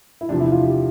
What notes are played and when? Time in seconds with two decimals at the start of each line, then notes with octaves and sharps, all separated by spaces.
0.21 E4
0.29 E2 C3 F3 D4
0.40 E4
0.52 F4
0.63 G4